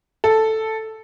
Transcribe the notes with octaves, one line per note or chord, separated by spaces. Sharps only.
A4